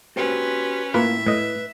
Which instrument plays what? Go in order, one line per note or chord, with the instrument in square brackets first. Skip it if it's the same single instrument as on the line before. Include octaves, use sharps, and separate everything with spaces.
[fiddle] C#4 B4 [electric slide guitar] F#4 G4 C5
[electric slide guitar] A2 [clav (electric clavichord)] A#3 F4 B4 [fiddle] E5
[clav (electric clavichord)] A2 D#5 [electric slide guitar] B4